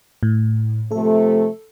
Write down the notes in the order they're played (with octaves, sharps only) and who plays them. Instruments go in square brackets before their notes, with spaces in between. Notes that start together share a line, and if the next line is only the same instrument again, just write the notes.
[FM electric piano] A2
[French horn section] C3 F3 A3 [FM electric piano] A4